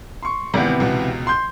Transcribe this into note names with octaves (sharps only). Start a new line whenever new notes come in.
C6 C#6
G#1 C3 E3 B3
C#2 B2
C6 G6